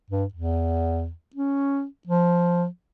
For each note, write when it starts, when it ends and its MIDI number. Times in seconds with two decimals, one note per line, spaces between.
0.10 0.25 43
0.33 1.10 40
1.36 1.85 61
2.07 2.66 53